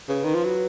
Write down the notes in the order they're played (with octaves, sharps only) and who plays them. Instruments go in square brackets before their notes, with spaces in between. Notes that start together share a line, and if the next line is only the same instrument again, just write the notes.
[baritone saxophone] C#3 [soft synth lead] B4
[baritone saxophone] D#3
F3
F#3